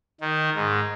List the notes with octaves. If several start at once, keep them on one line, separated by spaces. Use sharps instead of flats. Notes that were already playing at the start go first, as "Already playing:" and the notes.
D#3
G#2